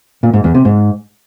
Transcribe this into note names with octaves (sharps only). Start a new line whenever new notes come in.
A#2
G#2
E2
C3
G#2